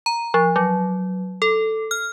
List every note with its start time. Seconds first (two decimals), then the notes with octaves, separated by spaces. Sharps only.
0.06 A#5
0.34 F3
0.56 F#3
1.42 A4
1.91 F6